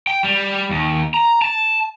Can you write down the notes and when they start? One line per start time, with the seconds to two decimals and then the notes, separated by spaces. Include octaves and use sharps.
0.07 G5
0.24 G3
0.70 D#2
1.14 A#5
1.42 A5